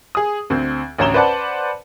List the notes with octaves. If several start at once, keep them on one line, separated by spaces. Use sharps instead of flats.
G#4 D#6
D2 C4
A1 D2 C#5 A#5 E7 G7
B4 C5 D5 F#5 A5